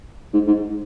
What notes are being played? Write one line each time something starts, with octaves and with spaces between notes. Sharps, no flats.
G#2
G#2